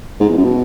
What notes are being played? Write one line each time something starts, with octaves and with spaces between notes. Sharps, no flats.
G#2
E2
F#2
B2